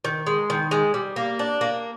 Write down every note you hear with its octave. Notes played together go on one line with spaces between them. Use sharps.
D#3
G#3
D#3
G#3
G3
A#3
D4
A#3